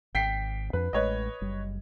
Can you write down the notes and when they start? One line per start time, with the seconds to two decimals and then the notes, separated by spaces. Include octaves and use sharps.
0.15 G#1 G5 B6 C7
0.73 F2 D4 B4
0.93 A1 G#3 B4 C#5 D#5
1.41 F#1 G3